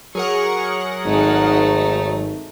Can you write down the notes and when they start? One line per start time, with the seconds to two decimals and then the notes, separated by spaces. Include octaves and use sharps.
0.15 F#3 G#4 A#4 F#5 C#6
1.05 G#1 G#2 A3 D#4